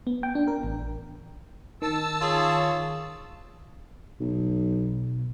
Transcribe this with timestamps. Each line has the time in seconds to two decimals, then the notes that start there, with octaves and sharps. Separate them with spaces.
0.07 B3
0.23 G5
0.35 D4
0.48 A#4
0.63 A1
1.82 D#3 A5 E6
2.22 F4 G#4 C#5
4.20 B1 B2